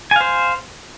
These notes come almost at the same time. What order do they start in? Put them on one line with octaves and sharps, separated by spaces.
G#5 F5 C5